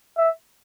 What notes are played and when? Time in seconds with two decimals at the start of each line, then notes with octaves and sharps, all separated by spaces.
0.17 E5